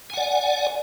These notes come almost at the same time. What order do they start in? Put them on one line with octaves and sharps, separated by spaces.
G#5 F#5 D5